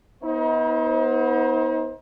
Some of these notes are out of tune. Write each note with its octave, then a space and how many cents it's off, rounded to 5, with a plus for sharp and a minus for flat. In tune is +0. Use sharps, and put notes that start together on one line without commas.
B3 -15 D#4 +40 C5 +25